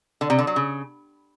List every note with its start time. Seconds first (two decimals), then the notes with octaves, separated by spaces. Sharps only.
0.21 D3
0.30 C3
0.39 D3
0.47 F#3
0.56 C#3